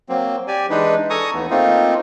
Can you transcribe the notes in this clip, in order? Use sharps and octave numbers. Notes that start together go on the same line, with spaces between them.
F#3 A#3 C4
G4 D5 G#5
E3 G#3 D4 D#4 B4
A4 G#5 A#5 C#6 D#6
D#2 E3 A3 B3
A3 A#3 C4 D#4 F4